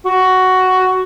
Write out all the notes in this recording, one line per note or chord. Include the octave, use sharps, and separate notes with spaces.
F#4